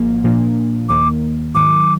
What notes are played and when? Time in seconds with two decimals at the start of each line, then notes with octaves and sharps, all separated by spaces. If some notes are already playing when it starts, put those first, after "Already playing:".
Already playing: G#1 G#2 F3 A#3
0.24 A#2 F3 A#3 D4
0.89 D#2 D#3 A#3 D6
1.55 G#2 D#3 F#3 D6